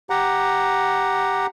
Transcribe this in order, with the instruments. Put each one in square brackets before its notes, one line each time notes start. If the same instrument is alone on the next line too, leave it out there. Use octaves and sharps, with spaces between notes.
[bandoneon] G4 F#5 A#5